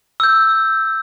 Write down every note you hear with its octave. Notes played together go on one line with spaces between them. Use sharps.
E6 G6